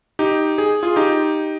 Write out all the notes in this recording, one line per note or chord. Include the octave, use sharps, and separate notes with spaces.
D#4 G4
G#4
F4 G#4
D#4 G4